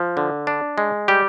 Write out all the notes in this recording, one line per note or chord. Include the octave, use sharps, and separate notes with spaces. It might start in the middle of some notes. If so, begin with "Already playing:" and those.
Already playing: F3
D3
D4
G#3
G3 G4